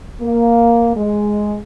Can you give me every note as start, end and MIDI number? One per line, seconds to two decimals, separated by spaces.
0.21 0.95 58
0.96 1.57 56